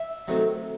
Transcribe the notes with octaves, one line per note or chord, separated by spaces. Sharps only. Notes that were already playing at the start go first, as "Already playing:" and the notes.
Already playing: E5
C3 D#3 F#3 A3